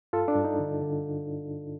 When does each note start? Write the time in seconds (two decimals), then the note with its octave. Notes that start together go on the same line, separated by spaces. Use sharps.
0.13 G2 F4 A4
0.28 D4
0.36 G2
0.44 D#4
0.60 D3
0.82 D3